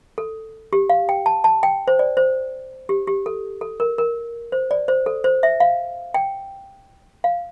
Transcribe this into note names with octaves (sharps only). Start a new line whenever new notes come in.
A4
G4
F5
G5
A5
A5
G5
C5
D5
C5
G4
G4
A4
A4
A#4
A#4
C5
D5
C5
A4
C5
E5
F5
G5
F5